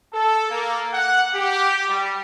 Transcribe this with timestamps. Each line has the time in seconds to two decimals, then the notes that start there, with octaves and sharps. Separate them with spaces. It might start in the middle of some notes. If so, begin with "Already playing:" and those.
0.13 A4
0.50 A#3
0.93 F#5
1.34 G4
1.89 G3